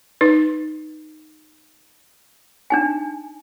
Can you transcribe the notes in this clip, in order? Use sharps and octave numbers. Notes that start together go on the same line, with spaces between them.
D#4 B4
D4 D#4 G#5